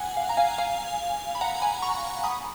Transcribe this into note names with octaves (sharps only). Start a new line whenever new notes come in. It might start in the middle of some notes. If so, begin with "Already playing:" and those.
Already playing: F#5 G#5
F5
A#5
F5 G#5
F5 G#5
B5
F#5 A#5
G#5 B5
A#5 C#6
B5 D#6